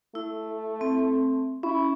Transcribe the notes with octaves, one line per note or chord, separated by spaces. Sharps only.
A3 E4
C4
C#4 E4